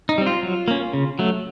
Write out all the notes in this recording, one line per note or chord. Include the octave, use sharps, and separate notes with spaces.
D#4
G3 C4
F4
F#3
A#3 C#4
C#3
F#3 A3